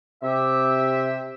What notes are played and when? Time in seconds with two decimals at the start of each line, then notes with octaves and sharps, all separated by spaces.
0.22 C3 G4 E5